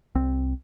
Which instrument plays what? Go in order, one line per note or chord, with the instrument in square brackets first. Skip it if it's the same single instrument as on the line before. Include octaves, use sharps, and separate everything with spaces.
[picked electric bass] C2 C4